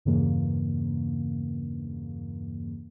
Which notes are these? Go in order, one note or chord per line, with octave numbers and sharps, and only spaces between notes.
E2 G2 C#3 E3 A#3